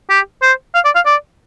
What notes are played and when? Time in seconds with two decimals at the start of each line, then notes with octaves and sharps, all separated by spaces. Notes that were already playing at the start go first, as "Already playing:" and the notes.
0.10 G4
0.42 C5
0.75 F5
0.85 D5
0.95 F5
1.06 D5